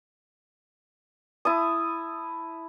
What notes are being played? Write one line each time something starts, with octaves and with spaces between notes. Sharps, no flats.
E4 A5 D#6